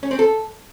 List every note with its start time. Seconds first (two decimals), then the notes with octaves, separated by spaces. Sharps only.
0.03 C#4
0.11 C4
0.19 A4